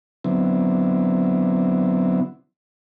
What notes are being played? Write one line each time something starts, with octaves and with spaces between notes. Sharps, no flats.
D3 F#3 B3 C4 E4